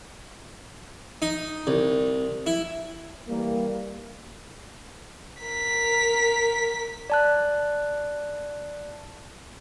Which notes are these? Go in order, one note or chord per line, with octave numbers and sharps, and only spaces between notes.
D#4
C2
E4
E3 G3 A#3
A#4 B6
D5 A5 F#6